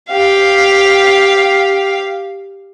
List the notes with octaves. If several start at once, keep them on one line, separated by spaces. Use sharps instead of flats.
G4 F5